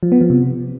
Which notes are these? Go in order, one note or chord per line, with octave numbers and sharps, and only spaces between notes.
F3
B3
F3
C3